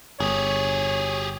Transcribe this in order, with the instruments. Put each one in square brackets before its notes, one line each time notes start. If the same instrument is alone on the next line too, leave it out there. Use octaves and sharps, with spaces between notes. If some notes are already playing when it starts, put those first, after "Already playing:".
[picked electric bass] G1 [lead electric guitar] G4 G#4 [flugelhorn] C#5